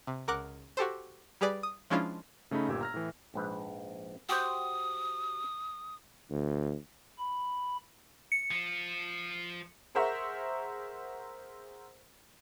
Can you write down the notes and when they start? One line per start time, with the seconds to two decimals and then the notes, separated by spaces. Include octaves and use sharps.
0.07 C3
0.28 C#2 A#4 F#5 D6 F#6
0.77 F#4 G4 A4 C5
1.41 G3 G4 G#4 B4 D5
1.63 D#6
1.90 F3 G#3 C#4 D4 E4 F4
2.51 C#3 A3 C#4 D#4 B5
2.68 G1 A#2 G4 E6 G#6
2.81 A#5 F6 A#6
2.94 A2 E3
3.34 A#1 G#2 B4
4.29 F#4 G4 C5 D#6
6.29 D2
7.19 B5
8.32 C#7
8.51 F3 F4
9.95 G#4 A#4 C5 E5 F#5 C#6